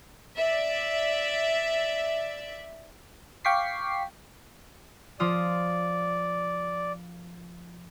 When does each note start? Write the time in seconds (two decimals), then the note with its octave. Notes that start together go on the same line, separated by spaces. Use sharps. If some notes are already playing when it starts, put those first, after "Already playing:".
0.38 D5 E5
3.45 F5 G5 C#6 D6 B6 C7
5.20 F3 F4 D5 D#6